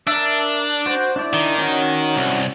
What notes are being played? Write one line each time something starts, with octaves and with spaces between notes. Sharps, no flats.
D4 A#4 E5
F#4 C5
D4 E4 D5
D#3
C#4 F#4
C2